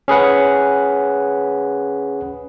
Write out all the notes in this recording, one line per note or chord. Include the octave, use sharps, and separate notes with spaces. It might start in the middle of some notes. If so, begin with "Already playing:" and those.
C#4 G#4 B4 F#5